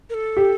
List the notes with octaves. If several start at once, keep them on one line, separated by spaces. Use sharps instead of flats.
A#4
A4
G4